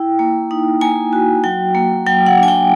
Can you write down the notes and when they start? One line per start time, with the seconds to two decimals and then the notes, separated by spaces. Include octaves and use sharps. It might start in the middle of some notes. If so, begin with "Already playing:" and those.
Already playing: E4 G5
0.19 A#3
0.51 D#4
0.81 A#3 G#5
1.13 F#4
1.44 F#3 G5
1.75 A#3
2.06 F#3 G5
2.26 F#5
2.37 D4
2.43 G#5
2.48 G5